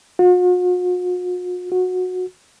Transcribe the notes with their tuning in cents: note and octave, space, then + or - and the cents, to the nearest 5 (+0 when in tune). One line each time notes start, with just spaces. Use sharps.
F#4 -45
F#4 -15